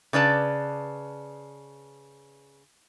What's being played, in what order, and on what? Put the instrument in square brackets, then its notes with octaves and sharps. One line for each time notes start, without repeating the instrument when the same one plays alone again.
[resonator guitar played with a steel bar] C#3 B4 D5 A5